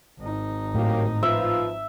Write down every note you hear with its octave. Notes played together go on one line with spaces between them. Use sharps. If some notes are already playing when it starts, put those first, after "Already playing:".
G#1 D#4
A2 F#3 A#3 G4
F3 F4 B4 E5